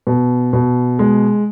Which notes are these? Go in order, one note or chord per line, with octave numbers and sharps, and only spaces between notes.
B2
B2
G#3